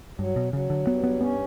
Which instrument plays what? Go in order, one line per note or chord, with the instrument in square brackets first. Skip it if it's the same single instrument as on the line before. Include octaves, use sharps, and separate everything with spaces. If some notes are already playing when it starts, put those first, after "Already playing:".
[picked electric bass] G2 [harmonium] F#3
[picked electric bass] B2
[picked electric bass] C#3 [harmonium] F#3
[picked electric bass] D3
[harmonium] G2 [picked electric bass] B3
[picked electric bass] B3
[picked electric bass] B3 [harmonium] C#4